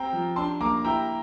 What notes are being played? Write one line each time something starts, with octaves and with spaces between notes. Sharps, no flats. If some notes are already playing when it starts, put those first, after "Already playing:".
Already playing: C4 G5 A#5
F3
D4 A5 C6
A#3 A#5 D6
E4 G5 A#5